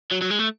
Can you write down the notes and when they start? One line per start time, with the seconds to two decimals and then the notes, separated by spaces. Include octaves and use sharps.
0.12 F#3
0.22 F#3
0.31 G#3
0.39 A3